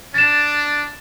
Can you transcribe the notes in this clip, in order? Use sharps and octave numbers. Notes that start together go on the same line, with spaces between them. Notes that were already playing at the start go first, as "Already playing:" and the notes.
D4 A6 E7